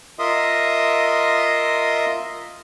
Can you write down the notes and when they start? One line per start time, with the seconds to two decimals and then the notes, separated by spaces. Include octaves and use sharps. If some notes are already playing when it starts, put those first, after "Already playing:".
0.19 F4 A#4 D#5 E5 C6 D#6